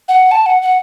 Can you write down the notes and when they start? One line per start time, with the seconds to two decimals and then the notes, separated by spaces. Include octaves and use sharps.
0.09 F#5
0.31 A5
0.46 F#5
0.62 F#5